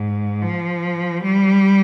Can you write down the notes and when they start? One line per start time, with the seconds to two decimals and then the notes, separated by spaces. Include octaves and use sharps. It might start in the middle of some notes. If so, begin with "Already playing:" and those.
Already playing: G#2
0.42 F3
1.23 G3